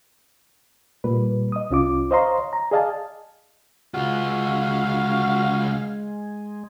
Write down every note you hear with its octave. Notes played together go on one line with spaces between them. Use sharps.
A#2 G3 B4
D#5 D#6
C2 C#4 F4 D6
C5 C#5 D#5 F5 A#5 C6
A#5
G#4 D5 D#5 F5 G#5 A5
C#2 G#3 F4 F#4 F5